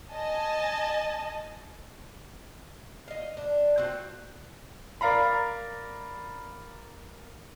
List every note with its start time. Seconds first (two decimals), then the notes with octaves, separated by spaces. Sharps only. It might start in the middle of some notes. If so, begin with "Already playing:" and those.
0.11 D#5 G#5 A5
3.08 D#5 F5
3.37 D4
3.78 C4 F4 F#4
5.01 A#4 D5 F5 A#5 B5